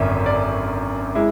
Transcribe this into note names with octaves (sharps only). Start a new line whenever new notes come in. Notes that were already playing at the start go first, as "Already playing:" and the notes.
Already playing: G#1 F#2 D3 C#4 E5
D5
G#3 E4